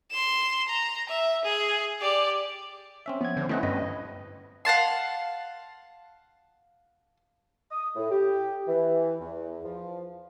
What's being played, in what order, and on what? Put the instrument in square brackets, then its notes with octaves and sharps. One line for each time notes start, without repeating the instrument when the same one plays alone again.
[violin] C6 E7
A#5
E5
G#4
G4 D5
[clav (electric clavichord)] C4 C#4 E5
[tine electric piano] F3 G#6 [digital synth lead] B3
[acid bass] D3 [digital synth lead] C5
[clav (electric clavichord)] E3 D#5 F#5 [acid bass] A3 [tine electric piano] C4 C#4 [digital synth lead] E4
[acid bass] G2 [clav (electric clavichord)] B4 [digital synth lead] D#5
[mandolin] F5 F#5 A5 C6
[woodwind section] D#6
A2
G4
E3
E2
F3